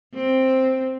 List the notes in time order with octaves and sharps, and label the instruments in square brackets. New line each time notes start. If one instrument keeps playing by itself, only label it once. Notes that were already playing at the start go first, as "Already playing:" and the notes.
[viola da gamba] C4